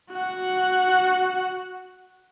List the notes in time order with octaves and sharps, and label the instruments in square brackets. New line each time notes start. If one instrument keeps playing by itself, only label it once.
[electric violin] F#4 F#5